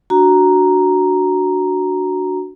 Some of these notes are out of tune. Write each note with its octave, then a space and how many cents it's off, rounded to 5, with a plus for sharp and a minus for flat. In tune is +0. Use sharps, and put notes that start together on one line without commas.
D4 +10 F#4 +0 A#5 +0